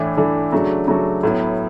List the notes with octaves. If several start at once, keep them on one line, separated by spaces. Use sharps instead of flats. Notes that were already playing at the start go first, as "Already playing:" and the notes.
Already playing: A2 E3 A3 D4
A2 E3 A3 D4
C#3 F#3 A3 D4 F#4
C#3 F#3 A3 D4 F#4
A2 F#3 B3 E4